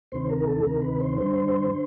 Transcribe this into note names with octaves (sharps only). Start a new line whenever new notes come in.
D2 C3 D#3 C5
A#4
A4
D2 C3 D#3 A#4
B4
C5
G2 D3 C5
D3